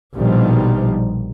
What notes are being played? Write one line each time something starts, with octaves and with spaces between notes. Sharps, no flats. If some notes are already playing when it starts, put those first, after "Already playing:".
A#1 B2 D#3 F3 G3